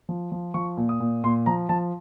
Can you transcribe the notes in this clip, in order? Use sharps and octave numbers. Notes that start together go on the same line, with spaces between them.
F3
F3
F3 C#6
A#2
D#6
A#2
A#2 C6
F3 A#5
F3 A5